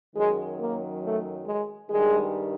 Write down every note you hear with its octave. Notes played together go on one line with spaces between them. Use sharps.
F#2 D#3 F#3 G#3
A#3
A3
G#3
G2 D#3 G3 G#3